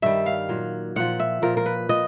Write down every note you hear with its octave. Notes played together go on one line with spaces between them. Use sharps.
G2 D#3 G3 E5
F5
A#2 F#3
A#2 F3 F#5
E5
A#2 F3 A#4
A#4
B4
F3 D#5